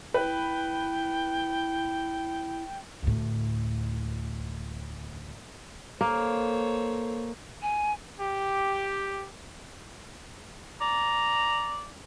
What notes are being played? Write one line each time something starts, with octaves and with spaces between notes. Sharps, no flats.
E4 B4 G5
D2 A2
A#3 A4 C5 C#5
G#5
G4
D5 A#5